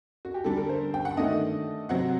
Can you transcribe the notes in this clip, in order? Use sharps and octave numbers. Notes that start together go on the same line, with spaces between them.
F#4
G4
D3 G3 D4 A4
A#4
C5
G5
F#5
D#3 A3 D4 D#5
C3 F#3 C4 F#5